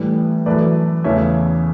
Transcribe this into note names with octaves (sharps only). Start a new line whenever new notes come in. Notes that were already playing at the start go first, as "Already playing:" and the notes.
Already playing: A2 E3 G3 B4
F#2 E3 A3 B4 D5
E2 C#3 E3 A3 C#5 E5